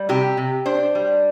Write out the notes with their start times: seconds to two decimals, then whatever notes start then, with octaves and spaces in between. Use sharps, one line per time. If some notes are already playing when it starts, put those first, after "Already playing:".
Already playing: G3
0.09 C3 G4
0.37 C3
0.66 D4 C5
0.95 G3